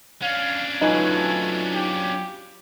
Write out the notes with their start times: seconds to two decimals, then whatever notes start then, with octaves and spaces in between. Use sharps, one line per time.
0.23 C#4 D4 F5
0.81 F#3 A3 D#4 F4 B4 G#5
1.73 G4